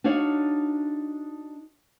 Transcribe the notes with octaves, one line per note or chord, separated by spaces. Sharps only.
D4 D#4 F#4 C#5 F5